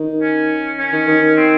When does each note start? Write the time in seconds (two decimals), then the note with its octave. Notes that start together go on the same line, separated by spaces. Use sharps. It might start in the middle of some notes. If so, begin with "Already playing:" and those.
Already playing: D#3
0.21 C#4
0.79 C#4
0.92 D#3
1.07 D#3
1.37 C4